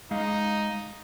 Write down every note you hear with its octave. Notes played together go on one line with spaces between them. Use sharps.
G#3 D#4 F5